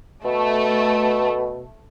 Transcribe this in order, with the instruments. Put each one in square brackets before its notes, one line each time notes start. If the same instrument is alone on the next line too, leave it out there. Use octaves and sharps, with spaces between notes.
[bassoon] B2 [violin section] A3